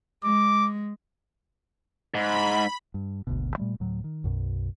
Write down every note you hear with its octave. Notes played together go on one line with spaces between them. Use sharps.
G#3 D6
G#2 B5
G2
G#1 D2 B2
A#2 G3 A3
D2 A2 F#3
D#3
B1 F#2 B2